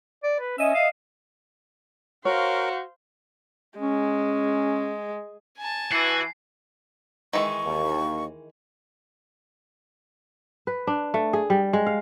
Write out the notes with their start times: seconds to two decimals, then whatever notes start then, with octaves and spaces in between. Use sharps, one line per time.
0.23 D5
0.40 B4
0.58 C#4 D#5 E5
0.74 F5
2.25 F#4 A#4 C5 C#5 F5
3.79 G#3 C#4
5.57 G#5 A5
5.92 E3 F#4 C7
7.33 D#3 E3 G#3 C#6
7.65 D#2
10.67 B4
10.87 D4
11.14 A3
11.33 G#4
11.50 G3
11.73 G#3
11.86 F5